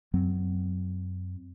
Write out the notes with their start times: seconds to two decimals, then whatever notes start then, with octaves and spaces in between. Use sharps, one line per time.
0.14 F#2 F#3 C4